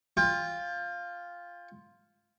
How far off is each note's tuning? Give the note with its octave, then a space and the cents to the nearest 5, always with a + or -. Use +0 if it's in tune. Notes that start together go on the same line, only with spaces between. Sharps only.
F4 +0 G5 +30